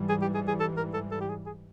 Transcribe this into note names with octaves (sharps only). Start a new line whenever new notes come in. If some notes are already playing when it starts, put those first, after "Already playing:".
Already playing: G#2 E3 G3
G#4
G4
G#4
G#4
A4
A#4
A4
A4
G4
G#4
G#4